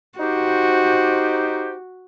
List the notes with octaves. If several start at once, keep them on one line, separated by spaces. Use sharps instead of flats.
D#4 F#4 G4 C5